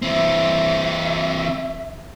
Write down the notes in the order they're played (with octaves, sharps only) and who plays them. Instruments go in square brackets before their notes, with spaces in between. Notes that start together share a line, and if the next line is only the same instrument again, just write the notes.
[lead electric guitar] E3 C4 [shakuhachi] E5